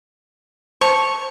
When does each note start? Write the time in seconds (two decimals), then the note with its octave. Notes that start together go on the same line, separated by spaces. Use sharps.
0.81 C5 A5 C#6